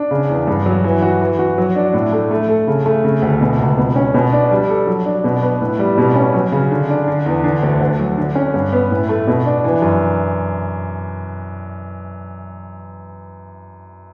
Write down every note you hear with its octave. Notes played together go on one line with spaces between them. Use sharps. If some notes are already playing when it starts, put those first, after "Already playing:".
Already playing: D4
C#3
E2
G2
F#3
E3
F#4
E3
F#4
F#3
D4
A2
A3
A3
A4
C#3
A3
C#3
D2
B2
C#2
B2
C#4
B2
D4
G3
A4
F#3
D4
B2
B3
A2
G3
B2
C#4
F#3
C#3
D3
D4
D3
E2
D3
D2
D2
F#3
D3
C#4
G2
B3
A2
A3
B2
D4
E3
F#2